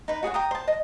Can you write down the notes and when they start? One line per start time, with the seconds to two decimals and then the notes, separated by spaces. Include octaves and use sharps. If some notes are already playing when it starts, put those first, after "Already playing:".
0.08 D#4 B4
0.23 F#4 G#4 C#5 F#5
0.34 G5 A#5 D#6
0.51 C5 A5
0.68 D#5